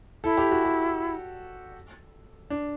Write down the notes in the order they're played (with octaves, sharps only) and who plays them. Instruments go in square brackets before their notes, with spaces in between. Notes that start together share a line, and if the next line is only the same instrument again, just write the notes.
[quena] E4 [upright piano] A4
[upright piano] G4
F#4
G4
D4